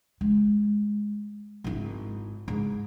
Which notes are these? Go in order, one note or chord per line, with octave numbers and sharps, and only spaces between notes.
G#3
G#1 E4
G#2